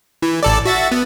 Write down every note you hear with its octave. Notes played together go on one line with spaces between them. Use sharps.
E3
A1 A4 D5
F#4 E5 A6
B3